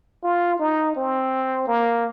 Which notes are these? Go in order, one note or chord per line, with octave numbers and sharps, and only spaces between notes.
F4
D#4
C4
A#3